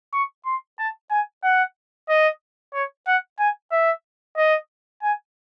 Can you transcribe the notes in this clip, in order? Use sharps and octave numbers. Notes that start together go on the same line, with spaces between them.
C#6
C6
A5
G#5
F#5
D#5
C#5
F#5
G#5
E5
D#5
G#5